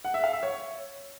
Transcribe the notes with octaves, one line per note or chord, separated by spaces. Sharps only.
F#5
E5
F5
E5
C#5